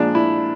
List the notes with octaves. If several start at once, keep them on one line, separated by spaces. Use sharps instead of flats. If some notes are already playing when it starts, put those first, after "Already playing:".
Already playing: A#2 F3 G#3 D4
E4